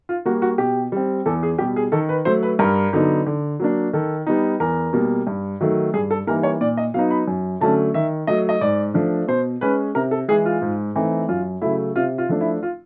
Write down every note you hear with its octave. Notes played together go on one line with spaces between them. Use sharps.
F4
G3 A#3 F#4
F#4
B2 G4
G3 C4
E2 A4
G#4
B2 G3 G4
G#4
D#3 A4
B4
F#3 A3 C5
B4
G2 A#4
D3 F#3 B3 D#4
D3
F#3 A#3 D4
D#3 A4
G3 B3 D#4
E2 A#4
B2 G3 A#3
G2
D#3 F#3 A3
G2 G#4
A4
E3 G3 A#3 D#4 A#4
C#5
A#2 D5
D#5
F#3 B3 D#4 F5
B5
F#2
D3 F#3 A3 C#4 A5
D#3 E5
F#3 A3 D#5
D#5
G#2 D5
F3 A3 D4
B2 C5
G#3 C#4 B4
C3 A#4
A4
E3 G#3 G#4
F4
G#2
E3 A3 C4 D#4
F#2 F4
C#3 F#3 A3 E4
C3 F4
F4
F3 A3 D4
E4
F4